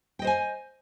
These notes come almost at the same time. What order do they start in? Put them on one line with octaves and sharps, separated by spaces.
G5 D#5 C5 G#5